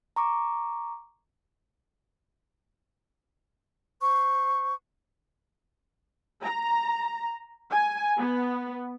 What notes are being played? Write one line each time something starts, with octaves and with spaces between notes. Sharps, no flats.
A#5 C#6 D6
C5 C#6
A#5
G#5
B3